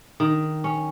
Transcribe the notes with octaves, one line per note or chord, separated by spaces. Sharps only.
D#3
C#4